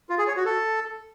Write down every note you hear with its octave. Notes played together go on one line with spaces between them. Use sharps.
F4
G#4
C#5
F#4
A4